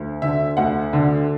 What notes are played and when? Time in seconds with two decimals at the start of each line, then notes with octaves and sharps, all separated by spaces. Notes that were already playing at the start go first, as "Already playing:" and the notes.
Already playing: D2
0.22 D3 E5
0.57 D2 F#5
0.93 D3